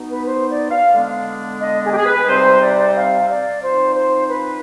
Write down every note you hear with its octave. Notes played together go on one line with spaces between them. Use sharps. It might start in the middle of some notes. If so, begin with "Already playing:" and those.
Already playing: B2 B3 D#4
B4
C5
D5
F5
D3 G#3 B3 D4
D#5
G#4
G4
G#4
B4
C3 G3 C4 D#4 C5
D5
F5
D5
F3 C4 D#4 C5
C5
B4